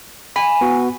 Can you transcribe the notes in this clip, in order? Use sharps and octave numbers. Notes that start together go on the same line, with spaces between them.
G#5 B5
B3 F#4